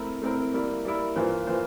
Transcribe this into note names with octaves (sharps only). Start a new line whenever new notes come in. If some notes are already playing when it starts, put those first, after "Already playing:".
Already playing: A3 C4 E4 A#4
A3 C4 E4 A#4
G3 A#3 E4
G3 A#3 E4
G2 E3 A#3 F4 C5
E3 A#3 F4 C5